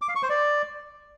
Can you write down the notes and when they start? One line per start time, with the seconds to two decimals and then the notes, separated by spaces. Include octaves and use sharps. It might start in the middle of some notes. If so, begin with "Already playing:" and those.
0.02 D6
0.09 F5
0.16 C#6
0.23 C5
0.30 D5